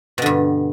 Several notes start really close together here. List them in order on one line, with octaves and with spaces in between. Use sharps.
B2 D3 G2